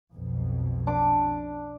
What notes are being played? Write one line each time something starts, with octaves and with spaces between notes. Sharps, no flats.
B1 F2 B2
D4 D6